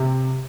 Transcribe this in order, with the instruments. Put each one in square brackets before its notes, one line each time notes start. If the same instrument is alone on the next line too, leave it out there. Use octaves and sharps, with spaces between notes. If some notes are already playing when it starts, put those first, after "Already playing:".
Already playing: [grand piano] C3